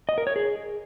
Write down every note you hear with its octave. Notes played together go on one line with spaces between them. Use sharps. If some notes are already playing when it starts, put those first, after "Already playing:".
D#5
A#4
C#5
G#4